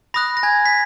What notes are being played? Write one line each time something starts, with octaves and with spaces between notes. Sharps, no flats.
B5 D#6 F#6 A#6
A#6
G#5 G#6
B6